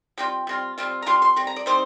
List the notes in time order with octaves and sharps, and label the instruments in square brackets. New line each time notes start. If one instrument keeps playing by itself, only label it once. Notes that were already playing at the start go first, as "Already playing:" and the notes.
[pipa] G3 C4 F4 G5
G3 C4 F4
G3 C4 F4
A#5
G3 C4 F4 C6
C6
G3 C4
A#5
D5
G3 C4 D#4 C5